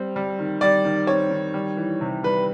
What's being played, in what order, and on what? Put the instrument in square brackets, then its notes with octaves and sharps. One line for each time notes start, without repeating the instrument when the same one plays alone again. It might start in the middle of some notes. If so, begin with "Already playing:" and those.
Already playing: [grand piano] G3 C4
G3
D#3
[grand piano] G3 [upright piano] D5
[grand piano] D#3
[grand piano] C4 [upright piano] C#5
[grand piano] D#3
G3
E3
C3
[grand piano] G3 [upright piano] B4